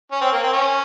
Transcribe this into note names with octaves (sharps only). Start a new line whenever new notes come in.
C#4
C4
A#3
C4
C#4